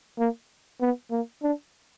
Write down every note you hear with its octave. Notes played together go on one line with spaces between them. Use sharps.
A#3
B3
A#3
D4